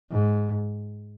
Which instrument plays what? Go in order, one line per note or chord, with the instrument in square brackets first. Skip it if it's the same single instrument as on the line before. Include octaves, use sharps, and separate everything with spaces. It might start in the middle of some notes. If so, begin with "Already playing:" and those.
[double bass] G#2